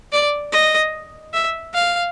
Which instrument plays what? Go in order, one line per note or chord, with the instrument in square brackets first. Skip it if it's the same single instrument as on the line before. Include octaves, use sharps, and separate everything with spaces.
[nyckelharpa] D5
D#5
E5
F5